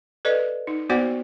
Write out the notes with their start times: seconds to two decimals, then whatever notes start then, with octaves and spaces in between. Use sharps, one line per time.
0.25 A4 B4 D5 D#5
0.67 D#4
0.89 A#3 B3 F#4 C5 D5 F#5